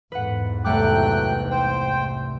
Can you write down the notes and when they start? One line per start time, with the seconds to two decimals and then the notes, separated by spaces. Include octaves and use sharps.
0.12 E2 G#2 B4 F#5
0.64 C2 F#3 A3 G5 D6 F#6
1.50 C5 G5